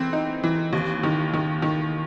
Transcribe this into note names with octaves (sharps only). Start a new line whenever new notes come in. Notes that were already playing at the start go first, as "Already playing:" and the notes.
Already playing: E3 C4
D#4
E3
D#2
D#3
D#3
D#3